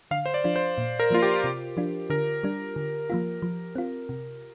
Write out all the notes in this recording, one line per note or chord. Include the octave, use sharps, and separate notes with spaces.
D3 F5
C5
D5
F3 D4 F4
C5
A#2
A#4
F3 A#3 F4
G4
C3
F3 D4 F4
D3 A#4
G3 D4
D3
F3 A#3 F4
F3
C4 F4
C3